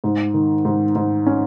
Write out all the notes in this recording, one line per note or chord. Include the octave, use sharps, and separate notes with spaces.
G#2
D#3
G#2
G#2
C#4